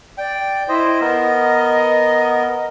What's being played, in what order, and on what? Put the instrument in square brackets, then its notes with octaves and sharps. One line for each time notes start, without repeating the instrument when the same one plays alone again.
[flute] D5 [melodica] G5
[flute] E4 [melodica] C5 D#5
[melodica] B3 A#4 [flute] D#5